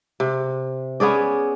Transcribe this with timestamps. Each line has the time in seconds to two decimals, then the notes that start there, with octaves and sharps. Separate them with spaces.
0.20 C3
1.00 B3 C#4 G#4 D5